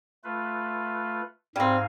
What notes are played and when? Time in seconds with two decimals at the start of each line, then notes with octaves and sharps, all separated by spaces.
0.24 A3 F4 B4
1.56 G#2 G3 C4 F5 G#5